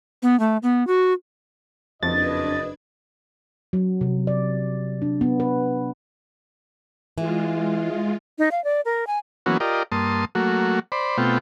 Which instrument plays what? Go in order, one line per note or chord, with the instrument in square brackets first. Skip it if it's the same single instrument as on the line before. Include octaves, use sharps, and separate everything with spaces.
[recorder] B3
A3
B3
F#4
[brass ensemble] F#1 D#5 [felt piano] F2 [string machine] D4 B4 G#6 [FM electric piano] A6
[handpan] F#3
C3
D5
D4
B3
B4
[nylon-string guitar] E3 [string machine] G#3 F4
[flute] D#4
F5
D5
A#4
G#5
[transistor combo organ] E3 F#3 A#3 B3 C#4 F#4
F4 G4 A#4 D5 D#5
G2 A#3 A5 C6 D#6
F#3 A3 A#3 F#4
C5 D5 B5
B2 A3 B3 C4 F4 G5